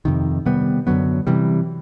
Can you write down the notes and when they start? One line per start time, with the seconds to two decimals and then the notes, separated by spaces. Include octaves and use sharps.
0.05 F2 C3 D#3
0.46 C3 D#3 G3 B3
0.87 F#2 D3 F#3 B3
1.27 C3 E3 G3